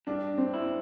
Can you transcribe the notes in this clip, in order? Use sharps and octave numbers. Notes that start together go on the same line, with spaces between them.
G2 D4
C4
E4